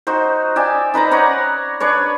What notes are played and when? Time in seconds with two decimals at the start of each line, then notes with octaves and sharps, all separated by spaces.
0.07 D#4 F#4 C5
0.56 D5 E5 G5 G#5
0.94 D#4 B4 C5 A#5
1.11 C#5 D5 F#5 A#5
1.80 D4 B4 C#5